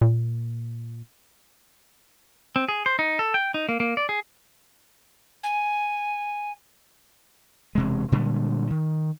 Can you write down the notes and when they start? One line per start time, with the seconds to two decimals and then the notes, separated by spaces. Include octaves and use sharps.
0.01 A#2
2.56 C4
2.69 G#4
2.86 C5
2.99 D#4
3.19 A4
3.34 G5
3.54 D#4
3.69 A#3
3.80 A#3
3.97 D5
4.09 G#4
5.43 G#5
7.75 E1 C3 G#3
8.12 A#2 D3 G3 G#3
8.71 D#3